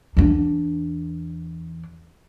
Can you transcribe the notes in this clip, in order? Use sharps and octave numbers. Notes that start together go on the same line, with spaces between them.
E2 D4